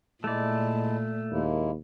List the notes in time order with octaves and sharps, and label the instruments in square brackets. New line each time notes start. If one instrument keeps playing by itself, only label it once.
[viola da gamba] A#2 [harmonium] G#3 E4 A5 [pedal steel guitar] A3 D5
[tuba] D#2 [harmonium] G#3 A#3 E4